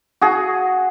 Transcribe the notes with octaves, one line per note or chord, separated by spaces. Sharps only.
F#4 G#4